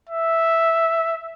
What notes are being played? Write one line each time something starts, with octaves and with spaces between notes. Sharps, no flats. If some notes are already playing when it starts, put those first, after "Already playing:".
E5